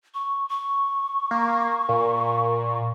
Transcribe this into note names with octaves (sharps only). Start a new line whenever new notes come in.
C#6
C#6
A#3
A#2